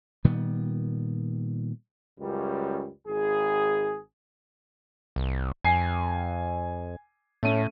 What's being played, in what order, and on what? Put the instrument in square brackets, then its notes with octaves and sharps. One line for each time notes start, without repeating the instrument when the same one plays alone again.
[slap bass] A#2 D#3 G3 B3
[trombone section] C#2 F#2 G3
G#1 G#4
[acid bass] C2
[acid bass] F2 [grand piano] G#5 C7
[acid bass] A2 [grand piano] A3 C#4 D#7